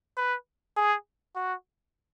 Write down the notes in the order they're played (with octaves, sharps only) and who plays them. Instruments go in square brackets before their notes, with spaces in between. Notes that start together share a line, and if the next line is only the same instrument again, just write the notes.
[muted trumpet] B4
G#4
F#4